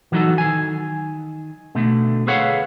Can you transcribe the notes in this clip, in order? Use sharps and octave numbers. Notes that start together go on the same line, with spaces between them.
E3 F#3 G3 D#4 F#4 A4
D#3 G#5
B2 D3 A3
G#4 A4 B4 C#5 F5 F#5